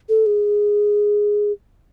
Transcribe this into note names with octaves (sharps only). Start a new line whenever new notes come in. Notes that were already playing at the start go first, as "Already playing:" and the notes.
A4
G#4